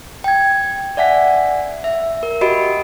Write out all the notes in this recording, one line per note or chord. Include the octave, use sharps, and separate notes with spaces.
G5 G#6
D5 E5 F#5 G#5 B6
E5
A#4
F#4 G4 D#5 B5 D7